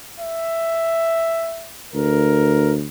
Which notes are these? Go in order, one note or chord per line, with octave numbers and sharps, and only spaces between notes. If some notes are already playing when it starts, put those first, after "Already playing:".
E5
D2 A#4